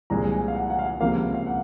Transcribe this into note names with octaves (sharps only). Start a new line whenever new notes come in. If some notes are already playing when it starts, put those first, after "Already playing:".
C2 A#2 F3 G#3 A#5
G#5
F5
F#5
F#5
F5
C#2 C3 F3 A#3 F5
F5
F#5